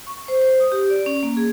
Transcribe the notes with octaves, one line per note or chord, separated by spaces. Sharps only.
C#6
C5
C5
D#6
G4
D5
C#4
A#3
G#4